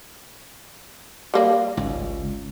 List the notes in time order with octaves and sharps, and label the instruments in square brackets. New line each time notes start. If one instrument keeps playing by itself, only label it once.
[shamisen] G3 A#3 D5
[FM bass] G#1 [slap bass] C#2